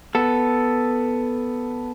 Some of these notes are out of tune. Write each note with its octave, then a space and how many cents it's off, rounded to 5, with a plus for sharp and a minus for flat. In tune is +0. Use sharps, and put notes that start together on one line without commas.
B3 +0 A4 +0